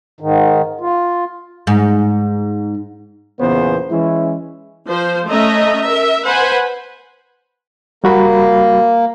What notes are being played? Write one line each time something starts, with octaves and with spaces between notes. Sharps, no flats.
G#2 D#3
F4
G#2
E2 A#2 C#3 B3 C5
E3 G#3 C#4 E4
F3 C5
A3 C#4 D#5 E5 A#5
A#4 E5
B4 C5 F#5 G#5 B5
G3 A#3 F#4 B5